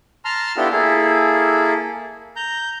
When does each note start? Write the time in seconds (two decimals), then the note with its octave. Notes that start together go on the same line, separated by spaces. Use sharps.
0.25 A5 A#5 C6 F6
0.57 B3 D4 E4 F4 G4 A4
0.72 A#3 E4 G#4 A4
2.36 A#5 G6